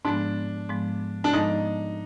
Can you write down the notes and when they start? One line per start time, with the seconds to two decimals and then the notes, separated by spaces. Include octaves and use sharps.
0.05 G#2 F3 G#3 B3 D4
0.69 G#2 F3 G#3 B3
1.24 D4
1.33 G#2 F3 G#3 B3 D#4